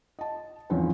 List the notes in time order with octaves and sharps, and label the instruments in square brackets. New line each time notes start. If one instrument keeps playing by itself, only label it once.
[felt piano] D#5 A5
E2 G#2 E3 F3 C4 C#4